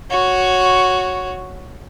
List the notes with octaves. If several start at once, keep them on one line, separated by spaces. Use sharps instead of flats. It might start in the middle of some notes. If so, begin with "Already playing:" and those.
F#4 C#5